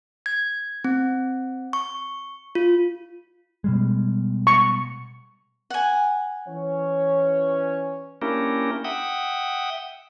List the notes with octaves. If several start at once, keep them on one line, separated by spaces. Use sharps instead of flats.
G#6
C4
C#6
F4
B2 G3 G#3
C#6
F#5 G#5
E3 C#4 C#5
A#3 C#4 D4 E4 G4 A#4
E5 F#5 G5 D#6